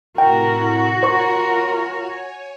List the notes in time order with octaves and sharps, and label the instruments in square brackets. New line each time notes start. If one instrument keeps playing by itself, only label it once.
[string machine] A2 C3 E4 [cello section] F#4 [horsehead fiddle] A#4 [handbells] G5
[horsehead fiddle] F4 A#4 [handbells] C5 C#6 [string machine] C#5 G#5